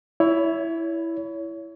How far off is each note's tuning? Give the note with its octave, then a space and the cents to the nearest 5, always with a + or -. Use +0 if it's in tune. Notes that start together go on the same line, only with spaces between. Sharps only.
E4 +0 C#5 +30